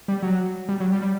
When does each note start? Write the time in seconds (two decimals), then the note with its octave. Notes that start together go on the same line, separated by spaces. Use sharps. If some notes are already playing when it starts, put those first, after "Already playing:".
0.08 G3
0.23 F#3
0.69 G3
0.80 F#3
0.92 G3
1.02 G3